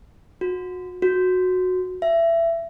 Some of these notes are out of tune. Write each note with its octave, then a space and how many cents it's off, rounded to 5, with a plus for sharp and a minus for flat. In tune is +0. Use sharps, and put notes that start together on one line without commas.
F#4 -25
F#4 -10
E5 +20